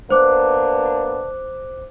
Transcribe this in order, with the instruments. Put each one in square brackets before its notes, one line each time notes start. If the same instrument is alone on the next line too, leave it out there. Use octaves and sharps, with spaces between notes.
[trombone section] A#3 B3 D4 [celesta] C5 D6 F#6